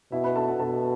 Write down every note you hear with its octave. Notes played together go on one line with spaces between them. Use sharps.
B2 E4 E5
B4 B5
A4 A5
F#4 F#5
B2 A4 A5